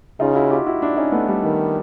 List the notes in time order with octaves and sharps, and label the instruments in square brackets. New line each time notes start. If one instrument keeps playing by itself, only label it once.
[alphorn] C#3 [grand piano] D#4 F4
[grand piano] E4 F#4
F4 G4
E4 F#4
D4 E4
C#4 D#4
A3 B3
G3 A3
[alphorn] D#3